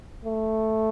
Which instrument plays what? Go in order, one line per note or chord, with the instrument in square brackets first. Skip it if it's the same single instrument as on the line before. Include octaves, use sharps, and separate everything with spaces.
[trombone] A3